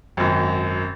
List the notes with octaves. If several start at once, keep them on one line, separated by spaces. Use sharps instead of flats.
G#1 F#2